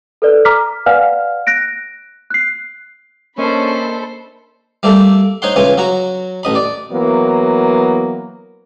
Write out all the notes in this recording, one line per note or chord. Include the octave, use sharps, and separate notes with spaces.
A4 B4 D5
A#5 D6 F6 B6
B4 D5 F5 F#5 G#5 F6
F#6 A#6 D7
F#6 C7
A#3 C#4 D4 A4 A#4 C5 D#5 B5
G3 A3 A#3 E5
D#4 C5 C#5 F#5 C6
C#2 E3 F4 C#5 G#5
F#3 F#4 A#5 C#6
A1 D#5 B5
D5
E3 F#3 A#3 B3